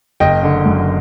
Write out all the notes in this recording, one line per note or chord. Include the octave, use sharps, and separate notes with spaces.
F#1 D#5 G5
D3
F#2